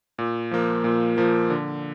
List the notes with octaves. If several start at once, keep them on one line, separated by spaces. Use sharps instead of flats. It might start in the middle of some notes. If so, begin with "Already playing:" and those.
A#2
F3 A#3
A#2
F3 A#3
D3